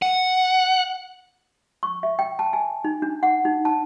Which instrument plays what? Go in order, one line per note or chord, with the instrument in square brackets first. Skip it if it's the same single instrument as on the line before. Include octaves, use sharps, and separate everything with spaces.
[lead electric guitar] F#5
[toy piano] C#6
E5
G5
A5
G#5
D#4
D4
F#5
D#4
A5